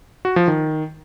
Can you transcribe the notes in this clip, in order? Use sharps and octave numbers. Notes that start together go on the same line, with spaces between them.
F#4
F3
D#3